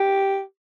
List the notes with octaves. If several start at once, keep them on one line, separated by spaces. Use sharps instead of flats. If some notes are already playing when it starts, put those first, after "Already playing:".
Already playing: G4